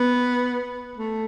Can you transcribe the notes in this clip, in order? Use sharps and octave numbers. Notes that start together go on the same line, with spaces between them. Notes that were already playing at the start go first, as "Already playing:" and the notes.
Already playing: B3
A3